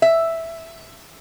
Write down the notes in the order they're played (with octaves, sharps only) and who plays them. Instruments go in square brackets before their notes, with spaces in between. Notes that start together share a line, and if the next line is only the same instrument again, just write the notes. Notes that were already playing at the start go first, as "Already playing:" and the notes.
[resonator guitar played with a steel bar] E5